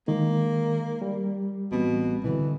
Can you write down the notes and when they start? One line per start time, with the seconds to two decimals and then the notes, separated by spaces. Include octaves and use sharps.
0.08 D#3 G#3 A#3
1.02 G3
1.72 A1 B2 C4
2.24 B2 D3 E3